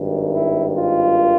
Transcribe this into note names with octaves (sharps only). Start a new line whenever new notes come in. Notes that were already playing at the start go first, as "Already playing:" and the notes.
Already playing: G#1 G2 D#3
E4
F4